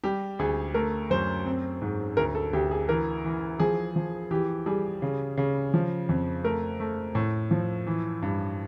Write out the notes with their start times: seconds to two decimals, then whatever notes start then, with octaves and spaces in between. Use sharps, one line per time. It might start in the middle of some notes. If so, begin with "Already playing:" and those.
0.04 G3 G4
0.39 D2 G#4
0.74 A3 A#4
1.10 F#2 C5
1.46 C4
1.82 G#2
2.17 D2 A#4
2.35 A4
2.53 D2 G4
2.71 G#4
2.89 E3 A#4
3.24 E3
3.60 F3 G#4
3.96 F3
4.31 E3 G4
4.66 G3 G#4
5.02 C#3
5.37 C#3
5.74 F3
6.09 F2
6.44 A3 A#4
6.80 A3
7.15 A2
7.51 F3
7.87 E3
8.22 G2